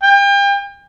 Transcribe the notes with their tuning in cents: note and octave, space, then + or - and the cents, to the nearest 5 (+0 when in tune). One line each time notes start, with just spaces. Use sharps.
G5 +35